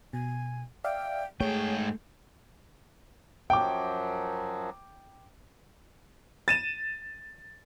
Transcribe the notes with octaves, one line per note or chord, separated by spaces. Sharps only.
B2 G#5
D5 E5 F5 G5
G#2 A3 G#4 C#5 G5
F#2 F3 F#3 G5 D6
A6 D#7 E7